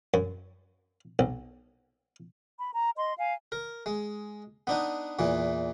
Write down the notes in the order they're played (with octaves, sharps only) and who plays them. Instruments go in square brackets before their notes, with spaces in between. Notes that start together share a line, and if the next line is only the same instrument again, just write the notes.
[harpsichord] F#2
B1
[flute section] B5
A#5
D#5 C6
F5 G#5
[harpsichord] A#4
G#3
B3 D4 D#4
E2 A#2 E3